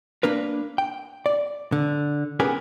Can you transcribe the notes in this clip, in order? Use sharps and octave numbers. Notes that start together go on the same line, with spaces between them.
A#3 D4 A#4 B4
G5
D5
D3
B3 C#4 G4 G#4 A#4 B4